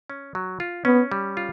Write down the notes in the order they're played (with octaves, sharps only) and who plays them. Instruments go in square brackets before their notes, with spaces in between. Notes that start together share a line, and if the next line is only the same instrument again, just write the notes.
[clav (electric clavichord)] C#4
F#3
F4
[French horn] B3 [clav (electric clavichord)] C#4
[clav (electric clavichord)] G3
F4